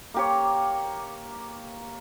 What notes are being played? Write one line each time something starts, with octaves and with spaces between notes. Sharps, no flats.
A#3 G4 C#5